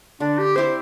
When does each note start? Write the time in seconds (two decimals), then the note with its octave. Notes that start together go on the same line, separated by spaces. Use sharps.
0.20 D3 D4
0.39 G4
0.56 C4 E4 G4 C5